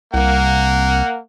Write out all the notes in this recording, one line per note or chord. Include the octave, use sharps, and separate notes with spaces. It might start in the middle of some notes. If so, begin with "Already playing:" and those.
C2 A#3 F#5